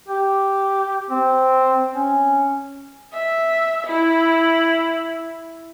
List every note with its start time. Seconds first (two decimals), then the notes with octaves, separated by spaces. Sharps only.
0.08 G4
1.10 C4
1.95 C#4
3.14 E5
3.87 E4